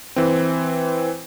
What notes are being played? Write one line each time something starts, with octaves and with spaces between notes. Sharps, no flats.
E3 C4